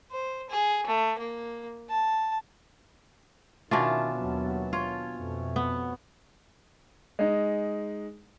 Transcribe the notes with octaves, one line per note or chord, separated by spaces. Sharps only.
C5
G#4
A3
A#3
A5
B2 D#3 C#4 D4 F4 E5 A5
D#2 F#3 B3
F4 C#5
F2 B2 A3
B3 F#5
G#3 D#4